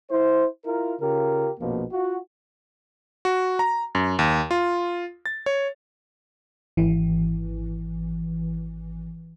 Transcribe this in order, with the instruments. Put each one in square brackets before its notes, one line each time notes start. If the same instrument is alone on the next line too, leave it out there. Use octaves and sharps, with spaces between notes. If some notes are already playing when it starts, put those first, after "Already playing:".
[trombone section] E4 C5
E4 F4 A#4
C#3 F4 G4 A#4
A#1 F2 B2 F3 A#3
F4 F#4
[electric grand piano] F#4
A#5
F#2
D#2
F4
A6
C#5
[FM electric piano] G#1 E3